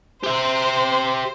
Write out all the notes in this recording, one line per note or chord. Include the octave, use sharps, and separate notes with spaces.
G4 C5 E5